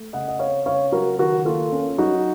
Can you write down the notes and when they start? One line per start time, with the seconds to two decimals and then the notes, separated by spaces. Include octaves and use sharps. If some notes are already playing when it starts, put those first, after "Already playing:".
Already playing: A3
0.13 C#3 D#5 F#5
0.28 D#5
0.39 C4 C#5 F5
0.66 C#3 C#5 F5
0.92 F#3 F#4 A#4
1.18 D#3 F#4 A#4
1.45 A#3 F4 A4
1.72 C#4
1.98 F#3 D#4 F#4